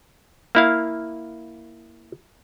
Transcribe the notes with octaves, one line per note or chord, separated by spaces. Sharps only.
A#3 E4 F5